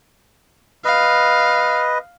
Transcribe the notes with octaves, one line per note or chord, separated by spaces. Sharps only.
B4 D#5 F5